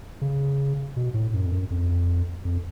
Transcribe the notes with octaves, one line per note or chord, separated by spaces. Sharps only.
C#3
B2
A2
F#2
F2
F#2
F2
F2